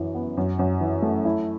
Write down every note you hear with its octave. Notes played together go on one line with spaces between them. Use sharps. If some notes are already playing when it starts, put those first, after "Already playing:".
Already playing: F#2 E3
B3
F#2
F#2
E3
A3
E4